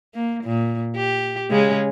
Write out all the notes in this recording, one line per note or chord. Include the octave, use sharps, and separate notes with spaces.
A#3
A#2
G4
C#3 G#3 C#4